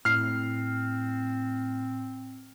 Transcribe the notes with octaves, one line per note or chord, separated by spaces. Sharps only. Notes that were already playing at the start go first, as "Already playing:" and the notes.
A2 C4 F6 C7